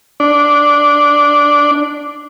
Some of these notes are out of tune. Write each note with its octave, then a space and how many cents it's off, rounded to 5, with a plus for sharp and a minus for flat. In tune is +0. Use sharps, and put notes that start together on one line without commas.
D4 -5